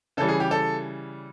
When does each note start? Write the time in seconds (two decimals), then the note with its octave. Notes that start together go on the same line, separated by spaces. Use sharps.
0.17 C#3 E3 G3 A4
0.28 G#4
0.40 G4
0.51 A4